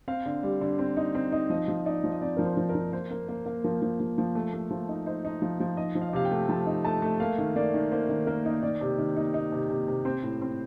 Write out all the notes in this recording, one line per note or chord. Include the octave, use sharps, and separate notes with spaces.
C4 F5
D3
G3
D3
C4
D#4
C4
D#4
F3 D#5
F3
D#4 D5
F3
D#5
C4 D5
F3 A#4
C5
F3
A#4
F3
A#3 C5
A#3
A#3
A#3
F3 A#4
F3
F3
F3
A3
A3
F3
D#4
D#4 C5
D#4
F3
F3
D#4 D#5
F3
F5
D#5
C3 F5
G5
A3
F3 A5
D#4
A3 A5
A3
A#3 F5
D#3
A#3 D5
D#3
A#3 C5
D#3
A#3 A#4
D#4
D#3 D5
C3
D#3
D#4
D#4
C3
C3
C3
C4 C5
A2
C4